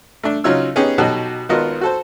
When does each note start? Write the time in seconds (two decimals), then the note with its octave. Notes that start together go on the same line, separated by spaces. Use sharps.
0.24 A3 D4
0.44 C#3 F#3 D#4 F4 C#5 E6
0.76 B3 C#4 D#4 G4 G#4
0.98 B2 F#3 D#4 F#4 G4 A4
1.49 G#1 B3 F4 F#4 A#4 D#5
1.81 F#4 A4 C5